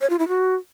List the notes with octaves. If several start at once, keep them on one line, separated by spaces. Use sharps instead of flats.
C#5
F4
E4
F#4